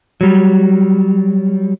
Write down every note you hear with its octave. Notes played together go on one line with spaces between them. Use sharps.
F#3 G3